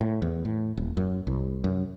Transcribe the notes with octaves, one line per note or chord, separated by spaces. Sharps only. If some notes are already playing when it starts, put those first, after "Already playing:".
A2
E2
A2
D#1
F#2
C2
F#2